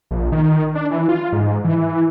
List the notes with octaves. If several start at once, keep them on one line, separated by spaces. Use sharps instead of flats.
A#1
D#3
D4
E3
F4
G#2
E3
E3